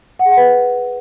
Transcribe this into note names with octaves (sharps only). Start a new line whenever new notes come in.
F#5
G#4
F#5
B4